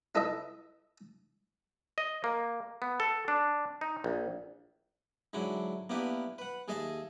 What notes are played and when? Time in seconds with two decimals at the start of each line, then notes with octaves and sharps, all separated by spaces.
0.15 D#4 E4 A4 B4 D#5 E5
1.98 D#5
2.24 A#3
2.82 B3
3.00 A4
3.28 D4
3.81 D#4
4.04 A#1
5.33 G#2 D3 F#3 D4 E4
5.90 A#3 B3 D4 E4 G4 B4
6.38 B4 F#5
6.68 D#2 G#4 A4 D#5 E5 A5